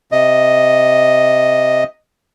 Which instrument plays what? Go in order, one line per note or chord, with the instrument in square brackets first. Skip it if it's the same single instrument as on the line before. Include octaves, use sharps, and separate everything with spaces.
[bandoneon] C3 D#5